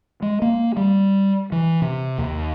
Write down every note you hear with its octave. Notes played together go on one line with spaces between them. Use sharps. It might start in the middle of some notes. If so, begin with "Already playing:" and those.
G#3
A#3
G3
E3
C3
D#2